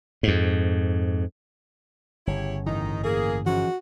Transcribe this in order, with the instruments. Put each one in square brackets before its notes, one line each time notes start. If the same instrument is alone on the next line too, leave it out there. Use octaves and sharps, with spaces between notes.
[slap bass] F2 G#2
[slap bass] G1 C#3 [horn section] E4 G4 C#5
[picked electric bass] A1 E3 [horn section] D#3 D#4
[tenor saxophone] A#3 [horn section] G#4
[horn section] G#2 [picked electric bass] E3 F3 C#4 [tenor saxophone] F#4